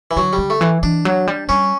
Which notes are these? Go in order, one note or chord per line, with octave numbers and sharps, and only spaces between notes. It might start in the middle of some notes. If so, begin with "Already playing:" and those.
E3
D3 F#3
G3
D3
A3
E3
E3 D4
F#3
G3
G3 C#4